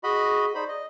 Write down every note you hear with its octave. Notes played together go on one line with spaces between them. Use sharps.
F#4 G#4 D#5 B5
D#4 C5 D5 B5
D#5